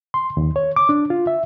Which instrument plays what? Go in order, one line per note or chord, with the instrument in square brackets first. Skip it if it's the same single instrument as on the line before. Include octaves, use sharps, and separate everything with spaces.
[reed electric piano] C6
D#2
C#5
D6
D4
F4
E5